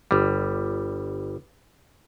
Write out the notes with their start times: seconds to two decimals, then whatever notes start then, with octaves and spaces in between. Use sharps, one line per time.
0.11 G1 G3